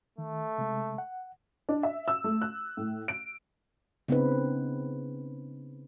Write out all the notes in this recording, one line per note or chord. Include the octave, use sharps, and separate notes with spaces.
D#3 A3
C3 G#3
F#5
D4
E5
E6
A3
F#6
A2
D7
C#3 B3 C4 D#4 B4